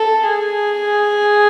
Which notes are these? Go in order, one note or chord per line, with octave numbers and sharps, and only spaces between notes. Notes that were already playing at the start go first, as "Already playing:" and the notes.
Already playing: A4
G#4